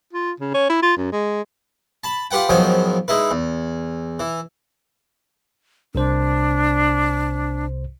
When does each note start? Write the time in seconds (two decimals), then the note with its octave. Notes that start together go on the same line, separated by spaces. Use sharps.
0.13 F4
0.40 C#3
0.54 C#4
0.69 E4
0.82 F4
0.97 F#2
1.12 G#3
2.04 A5 B5
2.31 F4 G4 B4 F#5 G5
2.49 G#2 D#3 F3 F#3 B3 G5
3.08 G#3 D#4 E4 B4
3.31 E2
4.20 E3
5.95 C2 C3 D4 C5